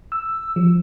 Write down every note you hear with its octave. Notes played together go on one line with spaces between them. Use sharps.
E6
F3